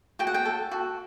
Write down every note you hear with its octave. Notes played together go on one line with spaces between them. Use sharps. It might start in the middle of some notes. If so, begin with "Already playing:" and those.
F#4 G5
F#5
G5
A4
F#4